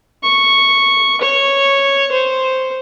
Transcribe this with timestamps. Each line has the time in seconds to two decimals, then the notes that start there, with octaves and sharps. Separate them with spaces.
0.24 C#6
1.21 C#5
2.12 C5